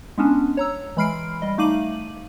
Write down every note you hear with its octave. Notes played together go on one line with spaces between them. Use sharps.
G#3 B3 C#4 D4
C#5 A#5 E6
E3 G#3 B5 F6 C7 D7
G3 D#5
A3 D#4 F5 D6 D#7 F#7